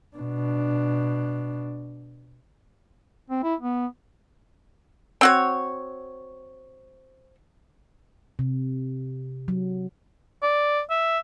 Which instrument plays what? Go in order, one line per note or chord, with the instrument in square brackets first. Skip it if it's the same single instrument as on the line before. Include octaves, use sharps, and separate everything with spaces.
[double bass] B2 D4
[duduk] C4
E4
B3
[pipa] C4 F#4 C#5
[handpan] C3
F#3
[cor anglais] D5
E5